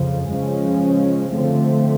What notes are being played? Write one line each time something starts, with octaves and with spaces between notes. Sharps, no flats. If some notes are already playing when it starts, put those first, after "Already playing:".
Already playing: F2 C#3 F3
C#3 F3 G#3 C#4
D3 F3 A3 C4